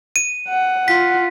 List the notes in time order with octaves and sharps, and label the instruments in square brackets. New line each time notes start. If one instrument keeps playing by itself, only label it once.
[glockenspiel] D#7
[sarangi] F#5
[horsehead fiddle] F4 [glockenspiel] B6